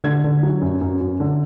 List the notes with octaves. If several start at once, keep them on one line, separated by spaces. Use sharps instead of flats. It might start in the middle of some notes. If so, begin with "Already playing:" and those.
D3 G#6
D3
F#3
F#2
F#2
F#2
D3